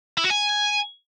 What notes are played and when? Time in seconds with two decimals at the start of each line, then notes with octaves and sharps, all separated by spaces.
0.17 E4
0.24 F#4
0.30 G#5